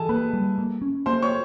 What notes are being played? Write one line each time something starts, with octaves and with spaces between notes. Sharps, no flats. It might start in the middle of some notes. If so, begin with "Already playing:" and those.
Already playing: E3 G#4 A4 G#5 A5
A#3 B4 B5
G3
A#3
C#4
A#3 C5 C6
C#5 C#6